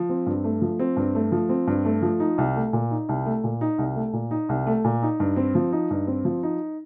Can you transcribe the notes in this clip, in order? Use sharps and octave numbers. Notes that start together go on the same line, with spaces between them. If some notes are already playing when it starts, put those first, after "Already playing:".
Already playing: F3
C4
G2
A3
F3
C4
G2
A3
F3
C4
G2
A3
F3
D#4
C2
A3
A#2
D#4
C2
A3
A#2
D#4
C2
A3
A#2
D#4
C2
A3
A#2
D#4
G2
C4
F3
D#4
G2
C4
F3
D#4